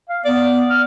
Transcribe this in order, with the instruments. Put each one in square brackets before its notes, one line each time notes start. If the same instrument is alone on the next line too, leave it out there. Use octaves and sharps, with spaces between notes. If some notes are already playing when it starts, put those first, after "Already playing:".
[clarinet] F5
[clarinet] B3 [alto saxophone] D5
[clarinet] F6